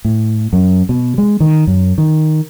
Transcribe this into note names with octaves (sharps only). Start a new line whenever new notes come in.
A2
F#2
B2
G#3
D#3
F#2
D#3